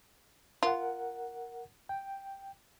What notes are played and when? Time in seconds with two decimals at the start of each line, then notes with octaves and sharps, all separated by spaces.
0.63 F4 A#4 F#5
1.89 G5